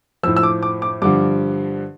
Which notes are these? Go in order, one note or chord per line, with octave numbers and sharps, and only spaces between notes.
A2 F3 E6
E6
D6
D6
D6
G2 D3 F3 D6